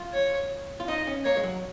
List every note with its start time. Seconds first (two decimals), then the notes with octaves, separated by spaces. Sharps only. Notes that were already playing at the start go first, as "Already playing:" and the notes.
Already playing: F4
0.13 C#5
0.80 F4
0.88 D#4 D#5
1.07 C#4
1.25 A#3 C#5
1.37 G#3
1.43 F#3